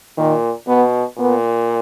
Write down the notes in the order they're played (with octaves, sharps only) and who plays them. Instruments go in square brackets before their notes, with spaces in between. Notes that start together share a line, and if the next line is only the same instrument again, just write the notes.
[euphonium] A#2 [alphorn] D#3
[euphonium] B2 [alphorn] B3
[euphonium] A#2 [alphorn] B3